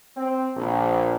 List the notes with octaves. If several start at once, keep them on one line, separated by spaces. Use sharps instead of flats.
C4
A#1